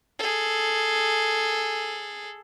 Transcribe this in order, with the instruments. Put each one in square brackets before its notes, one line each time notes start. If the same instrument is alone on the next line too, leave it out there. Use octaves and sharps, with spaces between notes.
[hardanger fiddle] G#4 A4